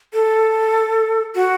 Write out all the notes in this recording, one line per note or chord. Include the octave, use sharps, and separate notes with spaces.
A4
F#4